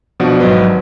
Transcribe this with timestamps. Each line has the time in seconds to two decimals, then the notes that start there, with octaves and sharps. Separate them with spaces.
0.20 B2 F3 D4 F#4
0.39 G#1 F#3 B4 D#5